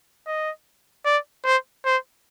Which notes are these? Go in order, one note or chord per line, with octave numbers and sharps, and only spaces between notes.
D#5
D5
C5
C5